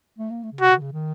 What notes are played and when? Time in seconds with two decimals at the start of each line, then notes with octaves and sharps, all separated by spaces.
0.19 A3
0.30 A#3
0.43 A3
0.52 C#3
0.60 C3 F#4
0.71 C3
0.78 D#3
0.82 C#3
0.93 D#3